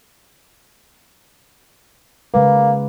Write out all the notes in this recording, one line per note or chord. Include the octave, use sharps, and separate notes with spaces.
C#3 G#3 A#3 B4